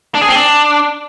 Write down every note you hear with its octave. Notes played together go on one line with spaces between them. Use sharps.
D4
G#4
C4
D4